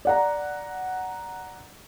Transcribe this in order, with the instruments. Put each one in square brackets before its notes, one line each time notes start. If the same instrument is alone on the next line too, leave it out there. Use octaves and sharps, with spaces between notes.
[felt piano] D5 F#5 A#5